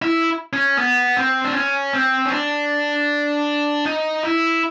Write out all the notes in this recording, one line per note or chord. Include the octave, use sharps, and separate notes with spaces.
E4
C#4
B3
C4
D4
C#4
C4
C#4
D4
D#4
E4